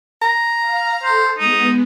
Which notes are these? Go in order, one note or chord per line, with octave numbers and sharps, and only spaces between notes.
A#5
F5 F6
A4 C5
G#3 B3 D#4